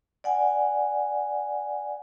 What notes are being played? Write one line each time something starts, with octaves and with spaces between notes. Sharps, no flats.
D5 F#5 G#5